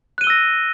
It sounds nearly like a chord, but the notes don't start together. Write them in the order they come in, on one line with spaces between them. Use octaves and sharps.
F#6 D#7 G7 E6 A#6